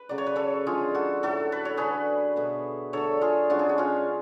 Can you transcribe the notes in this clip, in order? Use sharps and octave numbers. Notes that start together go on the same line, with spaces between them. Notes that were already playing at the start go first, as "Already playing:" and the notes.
Already playing: B4
C#3 F#3 A3 D5
C#5
B4
A4 C#5
D3 F3 G#3 F4 G#4
F#4 A4
A2 F#3 A3 F#4 A4
B4
C#5
D3 F#3 A3 G#4 B4
B2 A3
D3 F#3 A3 A4 C#5
F4 G#4
C#3 G#3 D4 F#4
G#4
F#4
C#4 F4